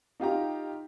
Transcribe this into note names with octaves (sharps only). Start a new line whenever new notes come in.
D#4 F4 G4 A#5